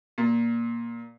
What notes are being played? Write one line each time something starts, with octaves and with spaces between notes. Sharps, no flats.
A#2